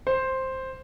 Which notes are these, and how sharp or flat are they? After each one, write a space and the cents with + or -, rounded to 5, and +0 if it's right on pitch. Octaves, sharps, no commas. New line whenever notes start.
C5 +5